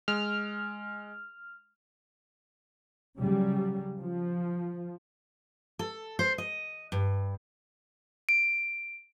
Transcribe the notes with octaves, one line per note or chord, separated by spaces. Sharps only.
G#3 F6
C#3 F#3 G3
F3
A4
C5
D#5
G2
D7